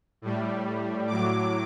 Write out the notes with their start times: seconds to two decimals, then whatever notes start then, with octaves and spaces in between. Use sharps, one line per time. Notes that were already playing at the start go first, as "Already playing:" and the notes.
0.22 A2 G3
1.07 A2 F#3 D6